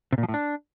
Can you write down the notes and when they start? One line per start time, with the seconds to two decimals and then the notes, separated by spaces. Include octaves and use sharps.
0.12 C3
0.18 A#2
0.23 F3
0.29 A2
0.34 D4